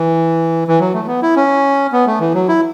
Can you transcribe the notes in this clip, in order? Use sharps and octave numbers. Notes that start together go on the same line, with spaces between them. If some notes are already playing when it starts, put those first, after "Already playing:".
Already playing: E3
E3
F#3
A3
B3
E4
C#4
B3
A3
E3
F#3
E4